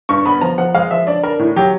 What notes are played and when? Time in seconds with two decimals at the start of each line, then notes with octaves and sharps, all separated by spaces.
0.09 G2 C#6
0.25 B3 B5
0.41 F3 A#5
0.58 F3 F#5
0.74 G#3 F5
0.91 F3 E5
1.07 D4 D5
1.23 D4 A#4
1.39 A2
1.56 F#3 G4